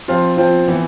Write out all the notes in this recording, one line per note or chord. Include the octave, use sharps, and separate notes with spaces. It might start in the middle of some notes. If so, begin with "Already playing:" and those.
F3 C4 F4
F3 C4 F4
E3 B3